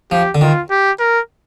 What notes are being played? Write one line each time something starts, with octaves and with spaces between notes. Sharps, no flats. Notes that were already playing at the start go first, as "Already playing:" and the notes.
F3 G4
D3
D#3 F4
G4
A#4